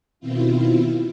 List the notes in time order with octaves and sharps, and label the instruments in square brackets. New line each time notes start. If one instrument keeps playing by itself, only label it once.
[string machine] B2 D#3 C4 E4 F4